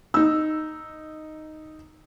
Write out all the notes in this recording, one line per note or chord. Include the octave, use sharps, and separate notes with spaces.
D#4 E6